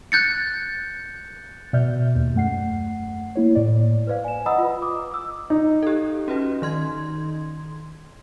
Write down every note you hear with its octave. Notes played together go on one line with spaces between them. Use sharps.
F#6 G6 A6 C#7
B2 D5 E5 F6 G6
D#2
F#2 A3 F#5 C7
A#3 E4 C#5
A2 D5
B4 C5 D5 F5
G#5 E7
D#5 F#5 A#5 B5 D#6 E6
F4 B4
D6 D#6
D6 E6
D#4
G4 A4
C#4 F#4 B4
D#3 C6 G#6